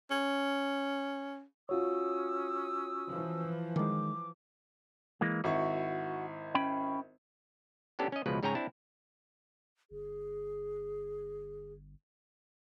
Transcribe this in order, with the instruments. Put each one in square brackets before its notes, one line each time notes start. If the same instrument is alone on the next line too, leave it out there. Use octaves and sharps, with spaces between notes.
[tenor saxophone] C#4
[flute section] C#4 D#6 E6 [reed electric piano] F4 F#4 C#5
[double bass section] E3 F3
[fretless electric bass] D#3 G#3 [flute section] D6
[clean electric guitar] E3 G#3 A#3
[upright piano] G#1 E4 C#6 [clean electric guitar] F#4
[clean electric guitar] C#4 G5 B5
[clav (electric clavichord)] B3 C#4 D4 G4 A4
C#4 D#5
C#2 B2 F3 G#3 B4
G#2 C#3 C#5 G5 G#5 A#5
C4 D4 E4 A5
[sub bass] G1 [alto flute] G#4